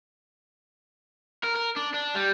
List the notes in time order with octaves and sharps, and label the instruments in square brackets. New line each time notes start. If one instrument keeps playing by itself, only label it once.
[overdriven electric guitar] A#4
A#4
D4
D4
G3